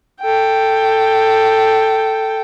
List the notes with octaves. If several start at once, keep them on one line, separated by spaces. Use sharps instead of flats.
A4 G5